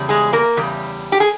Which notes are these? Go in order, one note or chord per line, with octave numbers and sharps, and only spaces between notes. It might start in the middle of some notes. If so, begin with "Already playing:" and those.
Already playing: E2 C#3 G3
G#3 G#4
A#3 A#4
E2 C#3 G3
G4
G#4